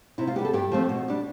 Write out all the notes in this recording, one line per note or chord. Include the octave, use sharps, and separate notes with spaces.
C3 E4
F4
G3 B3 G4
A4
G2 G4
F3 A3 C4
B2
G3 D4